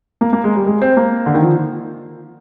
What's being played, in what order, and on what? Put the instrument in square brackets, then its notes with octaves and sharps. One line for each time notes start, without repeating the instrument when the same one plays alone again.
[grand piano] A#3
A#3
G#3
G3
G#3
C4
A#3
D3
D#3
F3